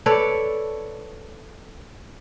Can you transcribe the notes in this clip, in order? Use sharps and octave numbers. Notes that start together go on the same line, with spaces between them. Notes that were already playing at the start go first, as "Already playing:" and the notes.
A4 B4 C#5 D5